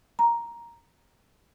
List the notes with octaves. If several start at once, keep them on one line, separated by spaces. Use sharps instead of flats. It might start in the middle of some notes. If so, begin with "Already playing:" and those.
A#5